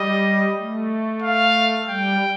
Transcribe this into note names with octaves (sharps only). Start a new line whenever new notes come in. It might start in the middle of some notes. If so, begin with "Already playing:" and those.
Already playing: G3 D#5
A3
F5
G3 G5